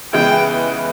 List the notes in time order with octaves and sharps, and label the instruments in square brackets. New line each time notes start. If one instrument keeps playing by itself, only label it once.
[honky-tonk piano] C#3 E3 G#3 B3 [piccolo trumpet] G5